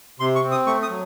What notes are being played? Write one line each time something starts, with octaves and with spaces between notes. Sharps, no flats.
C3 C6
C#6
C4
D#6
A3 C#6
D#6
F#3